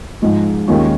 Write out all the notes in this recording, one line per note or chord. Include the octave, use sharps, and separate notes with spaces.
G#2 F3 G#3 D#4
D#2 D#3 G#3 C#4 F4